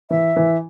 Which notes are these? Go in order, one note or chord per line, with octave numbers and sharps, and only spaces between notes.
E3 E5
E3